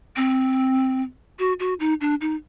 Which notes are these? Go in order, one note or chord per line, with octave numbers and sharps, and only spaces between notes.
C4
F#4
F#4
D#4
D4
D#4